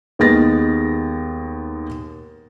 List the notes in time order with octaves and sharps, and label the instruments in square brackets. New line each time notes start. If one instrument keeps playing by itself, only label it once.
[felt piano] D#2 G#3 B3 A6 A#6